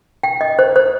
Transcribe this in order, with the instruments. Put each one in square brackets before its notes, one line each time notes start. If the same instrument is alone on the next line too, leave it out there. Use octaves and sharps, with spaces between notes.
[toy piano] G5
D#5
C5
C5